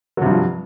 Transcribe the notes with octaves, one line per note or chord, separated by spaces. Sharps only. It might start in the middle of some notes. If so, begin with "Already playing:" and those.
G2 C3 F3 F#3